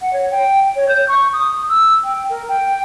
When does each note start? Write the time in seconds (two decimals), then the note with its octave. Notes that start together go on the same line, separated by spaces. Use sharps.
0.01 F#5
0.13 C#5
0.31 G5
0.76 C#5
0.89 G6
1.08 C#6
1.33 D#6
1.70 E6
2.04 G5
2.29 A#4
2.49 G5